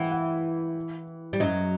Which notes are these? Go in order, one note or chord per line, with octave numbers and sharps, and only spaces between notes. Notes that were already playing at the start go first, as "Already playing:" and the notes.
Already playing: E3 F#5 G5
F#5
G3
F#2 F#3 D#5